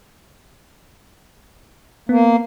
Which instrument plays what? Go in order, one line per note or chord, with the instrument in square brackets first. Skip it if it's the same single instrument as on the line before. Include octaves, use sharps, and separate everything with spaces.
[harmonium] A#3 [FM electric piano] B3